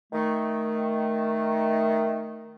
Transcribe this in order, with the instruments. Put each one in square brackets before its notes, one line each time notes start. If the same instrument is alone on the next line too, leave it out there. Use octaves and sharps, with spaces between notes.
[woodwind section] D#3 A3